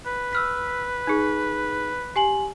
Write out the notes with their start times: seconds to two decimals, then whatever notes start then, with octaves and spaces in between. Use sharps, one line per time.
0.06 B4
0.33 E6 F6 B6
1.07 D#4 G#4
2.16 G4 G#5 F#7